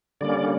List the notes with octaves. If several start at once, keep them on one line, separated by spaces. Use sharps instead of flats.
D3 G3 A#3 C#4 D5